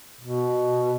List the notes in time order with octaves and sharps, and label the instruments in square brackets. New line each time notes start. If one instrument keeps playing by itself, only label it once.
[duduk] B2